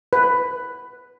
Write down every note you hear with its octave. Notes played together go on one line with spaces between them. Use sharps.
B4